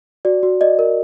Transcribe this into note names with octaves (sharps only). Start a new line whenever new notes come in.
F#4 D5
F#4
D5 D#5
A#4